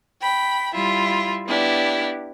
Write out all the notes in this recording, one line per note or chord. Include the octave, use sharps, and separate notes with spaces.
G5 B5
G3 E4 F4
B3 D4 E4 G4